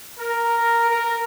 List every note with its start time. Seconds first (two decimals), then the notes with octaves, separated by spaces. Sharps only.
0.19 A#4
0.89 A#4